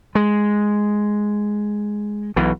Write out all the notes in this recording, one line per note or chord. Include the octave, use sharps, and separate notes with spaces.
G#3
B1 B2 E3